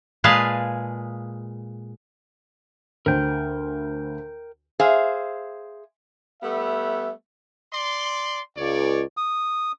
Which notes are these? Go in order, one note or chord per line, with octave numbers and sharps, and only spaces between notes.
A#2 G#3 G#4 B4 F5 A5
D2 A#4 C5 G5
G#4 C5 E5 F5
G3 A3 B3 E5
D5 C6
C#2 C#5 D5
D#6